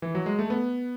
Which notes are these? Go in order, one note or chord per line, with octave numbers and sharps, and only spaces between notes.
E3
F#3
G#3
A3
B3